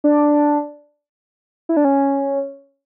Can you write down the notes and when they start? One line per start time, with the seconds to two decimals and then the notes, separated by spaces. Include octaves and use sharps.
0.04 D4
1.69 E4
1.77 D4
1.85 C#4